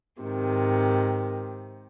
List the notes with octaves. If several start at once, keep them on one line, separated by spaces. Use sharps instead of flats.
G#2 C3 D#3